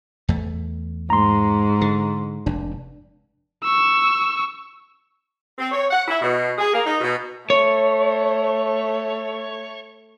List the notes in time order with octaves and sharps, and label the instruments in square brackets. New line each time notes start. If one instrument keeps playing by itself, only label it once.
[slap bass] E2 A3
[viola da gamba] G#2 [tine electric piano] A#5 C6
[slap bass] D3
[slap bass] F1 [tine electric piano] D4
[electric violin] C#6 E6
[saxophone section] C4
C#5
F#5
E4
B2
G#4
A#3
D#4
B2
[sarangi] A3 [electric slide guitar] C#5